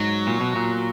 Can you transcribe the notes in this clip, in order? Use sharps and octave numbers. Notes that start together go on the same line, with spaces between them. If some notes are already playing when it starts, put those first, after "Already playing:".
Already playing: G#2 F#3
A#2
B2
A#2